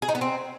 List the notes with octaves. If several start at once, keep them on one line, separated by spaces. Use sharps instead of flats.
G#4
D#4
B3
C4